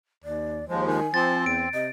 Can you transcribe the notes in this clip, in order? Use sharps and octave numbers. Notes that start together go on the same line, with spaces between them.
D#2 D5
D#2 F3 G#3 C5
D#3 G#5
F3 C4 A6
E2 D7
C3 D#5